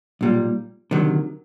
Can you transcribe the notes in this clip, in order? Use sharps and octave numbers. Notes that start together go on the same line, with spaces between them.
B1 A#2 G3
D2 C3 D#3 F#3